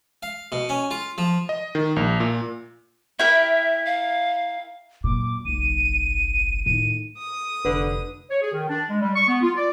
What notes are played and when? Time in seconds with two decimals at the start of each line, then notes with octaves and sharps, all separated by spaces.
0.23 F5
0.52 B2
0.69 C#4
0.91 F4
1.18 F3
1.49 D#5
1.75 D#3
1.96 A#1
2.20 A#2
3.19 E4 A#4 E5 G5
3.86 F5
5.04 F#2 A#2 D6
5.45 F#1 B1 D#7
6.66 A2 D#3 D#7
7.18 D#6
7.65 F1 D3 B4
8.31 C#5
8.42 G#4
8.54 D#3
8.69 D4
8.90 G#3
9.02 G3
9.16 C#6
9.28 B3
9.43 F4
9.57 D5